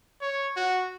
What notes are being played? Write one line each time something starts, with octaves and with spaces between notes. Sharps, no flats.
C#5
F#4